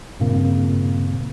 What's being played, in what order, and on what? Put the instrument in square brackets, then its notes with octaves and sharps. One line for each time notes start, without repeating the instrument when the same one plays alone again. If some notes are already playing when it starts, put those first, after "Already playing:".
[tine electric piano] G2 A#2 C#3 A#3 C4